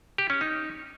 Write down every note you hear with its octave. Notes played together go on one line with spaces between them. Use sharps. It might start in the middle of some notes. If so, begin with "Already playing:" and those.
G4
C#4
D#4